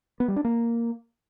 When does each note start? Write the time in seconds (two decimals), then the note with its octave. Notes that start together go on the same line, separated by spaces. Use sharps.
0.20 B3
0.28 G3
0.36 D4
0.45 A#3